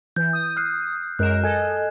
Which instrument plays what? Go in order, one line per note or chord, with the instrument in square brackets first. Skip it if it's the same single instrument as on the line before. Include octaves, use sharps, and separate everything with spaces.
[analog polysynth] E3 [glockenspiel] G6
[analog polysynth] D#6
[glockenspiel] F6 F#6 C7
[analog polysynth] F#2 G#3 A#4 [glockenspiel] F#6 E7
[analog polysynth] A4 D#5 [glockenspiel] G#5 G#6